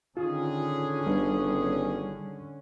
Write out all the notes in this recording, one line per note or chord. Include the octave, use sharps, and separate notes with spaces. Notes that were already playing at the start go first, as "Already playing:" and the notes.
D3 D#3 C#4 F4 G#4
G1 G3